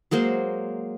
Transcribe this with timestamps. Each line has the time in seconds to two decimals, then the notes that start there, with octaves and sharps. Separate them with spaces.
0.11 F#3 G#3 A#3 C5